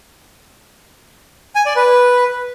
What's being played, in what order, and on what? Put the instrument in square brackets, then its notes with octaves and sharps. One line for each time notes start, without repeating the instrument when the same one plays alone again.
[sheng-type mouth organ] G#5
D5
B4